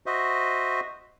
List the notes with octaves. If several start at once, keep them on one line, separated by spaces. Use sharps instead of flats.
F#4 C5 D#5 E5